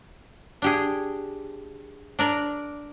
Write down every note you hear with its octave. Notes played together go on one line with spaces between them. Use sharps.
D4 G4 G#4
D4 A#4 D5